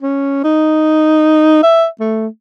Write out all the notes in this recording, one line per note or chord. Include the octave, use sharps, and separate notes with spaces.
C#4
D#4
E5
A3